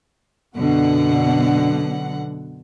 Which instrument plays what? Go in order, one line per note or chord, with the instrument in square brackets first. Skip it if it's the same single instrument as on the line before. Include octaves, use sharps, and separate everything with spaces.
[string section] F#2 B2 D3 F#5